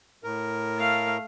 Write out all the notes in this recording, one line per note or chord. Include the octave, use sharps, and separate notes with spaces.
A2 A#4
A3 F5